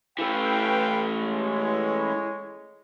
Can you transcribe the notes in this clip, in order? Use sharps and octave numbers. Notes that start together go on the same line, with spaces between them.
E3 A3 B4 F5 G5
G#3 C#5